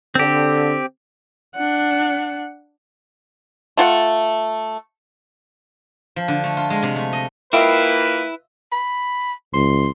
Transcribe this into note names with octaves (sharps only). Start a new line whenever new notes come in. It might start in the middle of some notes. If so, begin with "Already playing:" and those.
D3 C4 G4
D4 F#5
A3 F4 F#5
F3
D3
A3
F4
G#3
C3
A3
D#5
A#3 E4 F4 B4 D#5 E5 G5
B5
C#2 C6